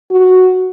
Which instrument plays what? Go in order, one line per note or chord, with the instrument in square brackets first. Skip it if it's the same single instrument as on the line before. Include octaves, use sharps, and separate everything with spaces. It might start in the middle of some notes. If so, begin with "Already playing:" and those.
[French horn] F#4